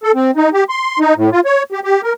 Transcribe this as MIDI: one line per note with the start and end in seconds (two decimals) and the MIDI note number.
0.03 0.12 69
0.15 0.31 60
0.36 0.50 63
0.53 0.64 67
0.69 0.99 84
0.99 1.14 63
1.17 1.30 45
1.32 1.40 65
1.45 1.63 73
1.72 1.80 67
1.84 2.01 67
2.03 2.13 70